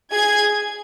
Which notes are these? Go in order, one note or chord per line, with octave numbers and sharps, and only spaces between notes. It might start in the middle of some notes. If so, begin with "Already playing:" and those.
G#4 G#6